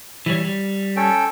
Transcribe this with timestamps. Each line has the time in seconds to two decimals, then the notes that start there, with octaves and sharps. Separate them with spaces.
0.26 E3 G3 C#5
0.45 G3
0.96 C#4 A4 G5